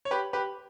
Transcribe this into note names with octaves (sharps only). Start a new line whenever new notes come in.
C#5
G4 B4
G4 B4